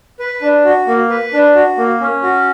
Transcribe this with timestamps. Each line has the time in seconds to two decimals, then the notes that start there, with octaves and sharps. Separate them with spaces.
0.19 B4
0.41 D4
0.64 F#4
0.87 A#3
1.10 B4
1.33 D4
1.55 F#4
1.77 A#3
2.01 C#4
2.23 F#4